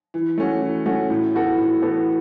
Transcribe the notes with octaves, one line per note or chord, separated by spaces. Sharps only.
E3
A3 C#4 F#4
E3
A3 C#4 F#4
A2
E3 B3 F#4 A4
A2
E3 B3 F#4 A4